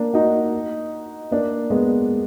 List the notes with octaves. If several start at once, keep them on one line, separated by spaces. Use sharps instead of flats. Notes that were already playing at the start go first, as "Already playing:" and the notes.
Already playing: A#3 D4
D#4 F#4
A#3 D4
G#3 B3